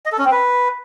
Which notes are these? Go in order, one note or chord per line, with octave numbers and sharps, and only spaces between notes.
D#5
A4
C#4
C4
B4